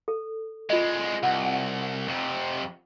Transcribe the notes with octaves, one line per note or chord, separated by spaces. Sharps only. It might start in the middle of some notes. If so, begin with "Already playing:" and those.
A4
C2 G#3 F4 D#5
C2 F#5
F2 C3